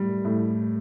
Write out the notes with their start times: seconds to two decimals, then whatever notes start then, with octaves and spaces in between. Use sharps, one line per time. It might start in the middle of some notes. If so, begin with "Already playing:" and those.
Already playing: A2 G3
0.25 A2